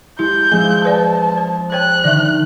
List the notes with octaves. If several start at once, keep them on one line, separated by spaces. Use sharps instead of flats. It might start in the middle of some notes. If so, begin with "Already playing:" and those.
G#3 E4 G4 G6
F3 G#3 C4 E4 G#5
B4 D5 A5
C5
C5 C#5 G5 F#6
D3 D#3 D5 E5